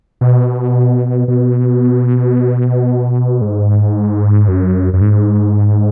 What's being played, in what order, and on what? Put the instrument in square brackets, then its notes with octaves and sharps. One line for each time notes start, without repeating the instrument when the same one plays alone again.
[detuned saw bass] B2
B2
G#2
F#2
F#2
G#2